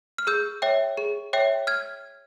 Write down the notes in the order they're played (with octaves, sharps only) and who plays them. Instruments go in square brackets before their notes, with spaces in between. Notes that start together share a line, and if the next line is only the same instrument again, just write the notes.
[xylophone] F6
G#4 E6 G6
C#5 E5 G5
G#4
C#5 E5 G5
F6 G#6